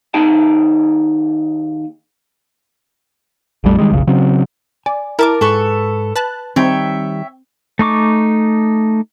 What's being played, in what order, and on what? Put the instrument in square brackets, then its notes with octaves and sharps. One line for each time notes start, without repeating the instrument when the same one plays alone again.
[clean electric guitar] D#2 D#4 G#4 G5 A5
[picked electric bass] A#1 F2 G3 A3
D#3 G3 G#3
F1 B1 C#3
C#3 F#3 C4
[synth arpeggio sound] D5 [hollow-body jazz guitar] G#5
[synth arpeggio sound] E4 A5 D6 [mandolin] A#4 F6
[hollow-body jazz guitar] G#2 [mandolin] A4 B4 C#6
[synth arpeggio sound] B4 A5 F#6
[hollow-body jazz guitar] D#3 G3 D#4 [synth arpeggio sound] C4 [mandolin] C#5 E5 G5
[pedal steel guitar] A3 D#4 C#6 D6